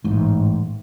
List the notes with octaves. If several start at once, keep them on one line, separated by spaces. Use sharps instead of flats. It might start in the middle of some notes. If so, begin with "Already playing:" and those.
A1 G#2